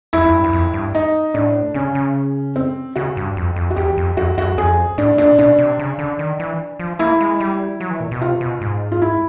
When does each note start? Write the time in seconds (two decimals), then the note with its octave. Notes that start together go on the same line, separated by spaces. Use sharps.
0.13 F2 E4
0.24 F2
0.34 G2
0.44 F#2
0.53 F2
0.73 G2
0.95 D#4
1.34 A2 D4
1.74 C#3 C#4
1.95 C#3
2.56 C4
2.96 C#3 F#4
3.17 G2
3.37 F2
3.56 F2
3.70 F#4
3.76 E2 G4
3.98 F2
4.17 F2 F#4
4.38 F#2 F#4
4.58 F2 G#4
4.98 A2 D4
5.18 A#2 D4
5.38 B2 D4
5.59 C3
5.79 C#3
5.99 D3
6.19 D#3
6.40 E3
6.79 F3
6.99 A#3 E4
7.21 G#3
7.40 G3
7.80 F#3
7.91 E3
8.00 A#2
8.11 B2
8.21 C3 F4
8.41 B2
8.61 G#2
8.92 F4
9.02 E4